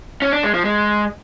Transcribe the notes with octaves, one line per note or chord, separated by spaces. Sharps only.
C#4
D4
G#3
F3
G#3